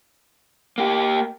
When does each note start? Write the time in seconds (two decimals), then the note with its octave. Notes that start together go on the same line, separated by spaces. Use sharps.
0.78 A#3 G4